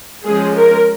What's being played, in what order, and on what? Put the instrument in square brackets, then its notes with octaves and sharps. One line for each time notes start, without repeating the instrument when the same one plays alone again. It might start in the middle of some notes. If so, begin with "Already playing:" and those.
[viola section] F3 G#3 C#4 G#4
A#4